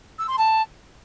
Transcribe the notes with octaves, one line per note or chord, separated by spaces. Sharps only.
E6
C6
A5